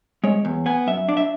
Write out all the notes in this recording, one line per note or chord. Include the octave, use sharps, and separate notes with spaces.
G#3 C#5
E2
B3 G#5
F#2 E5
D4 D5
E5